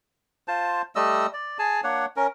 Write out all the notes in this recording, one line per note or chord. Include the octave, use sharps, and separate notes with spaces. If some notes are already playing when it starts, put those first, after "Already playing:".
F4 C5 A5
G3 A3 D#5 E6
D5
G#4 G#5 A5
A#3 D4 C#5 F#5
C#4 A#4